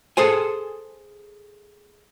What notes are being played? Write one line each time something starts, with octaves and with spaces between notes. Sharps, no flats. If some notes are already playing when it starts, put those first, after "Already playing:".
G#4 A4 C5 G#5